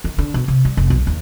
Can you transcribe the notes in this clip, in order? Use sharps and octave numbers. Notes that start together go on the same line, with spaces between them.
D#3
D3
B2
C3
G3
F1
B1
D#2